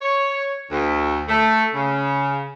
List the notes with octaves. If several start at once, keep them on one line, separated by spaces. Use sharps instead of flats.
C#5
D2
A3
C#3